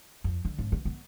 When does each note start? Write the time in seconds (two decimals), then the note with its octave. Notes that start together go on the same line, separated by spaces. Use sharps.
0.24 F2
0.45 D3
0.59 G#1
0.72 B3
0.85 B3